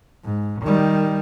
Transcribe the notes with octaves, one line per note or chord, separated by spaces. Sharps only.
G#2
D#3 G3